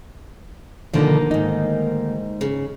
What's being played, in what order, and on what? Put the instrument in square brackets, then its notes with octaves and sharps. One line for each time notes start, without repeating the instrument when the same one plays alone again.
[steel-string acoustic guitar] D2 D#3 A#3 [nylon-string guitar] B2 D3 F3
[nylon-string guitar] G#2 D#4
[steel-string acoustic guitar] C#3